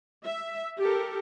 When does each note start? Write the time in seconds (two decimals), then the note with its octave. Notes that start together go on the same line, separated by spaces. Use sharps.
0.23 E5
0.78 G4 A4 A#4